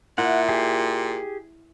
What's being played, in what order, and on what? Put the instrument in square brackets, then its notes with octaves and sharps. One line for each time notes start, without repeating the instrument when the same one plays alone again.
[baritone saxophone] A#2 [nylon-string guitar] E4 [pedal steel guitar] F#5
[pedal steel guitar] G4 G#4